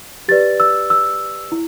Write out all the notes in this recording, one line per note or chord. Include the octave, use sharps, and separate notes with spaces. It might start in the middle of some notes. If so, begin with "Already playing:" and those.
G4 B4 D5 A6
E6
E6
E4